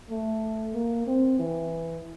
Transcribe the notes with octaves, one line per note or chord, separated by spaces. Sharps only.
A3
A#3
C4
E3